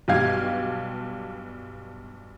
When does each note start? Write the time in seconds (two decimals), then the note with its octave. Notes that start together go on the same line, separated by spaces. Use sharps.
0.08 B1 G2 G4 F5 G#6